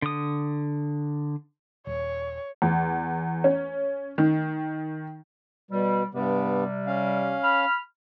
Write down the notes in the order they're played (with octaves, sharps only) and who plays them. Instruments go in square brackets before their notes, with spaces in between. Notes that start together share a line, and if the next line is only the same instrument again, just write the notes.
[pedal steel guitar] D3 D#6
[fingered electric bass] D#1 [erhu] C#5
[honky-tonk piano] E2
C#4
D#3
[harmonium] B2 [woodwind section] G3
[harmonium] G2 B3 [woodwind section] C3 G3
[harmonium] C#4 F5
[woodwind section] B5 F6